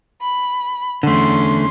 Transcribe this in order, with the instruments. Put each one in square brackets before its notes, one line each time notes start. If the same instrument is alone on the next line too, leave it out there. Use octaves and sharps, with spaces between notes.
[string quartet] B5
[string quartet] E2 C#4 C6 [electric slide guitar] D3 A3